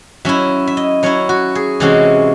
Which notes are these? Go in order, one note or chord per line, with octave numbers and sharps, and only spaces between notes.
F#3 C#4 E4 E5
E5
D#5
F#3 C#4 E4 C#5
F#4
G#4
C3 E3 G#3 C#4 E4 F#4